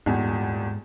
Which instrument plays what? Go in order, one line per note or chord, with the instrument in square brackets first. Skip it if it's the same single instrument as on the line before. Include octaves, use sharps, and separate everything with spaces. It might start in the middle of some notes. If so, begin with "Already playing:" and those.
[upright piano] D#1 E2 [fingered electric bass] G#2